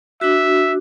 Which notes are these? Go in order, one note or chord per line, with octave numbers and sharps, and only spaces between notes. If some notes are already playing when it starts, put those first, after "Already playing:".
D4 F#4 E5